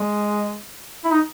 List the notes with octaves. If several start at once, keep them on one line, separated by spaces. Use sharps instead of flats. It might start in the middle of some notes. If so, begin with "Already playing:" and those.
Already playing: G#3
E4
D#4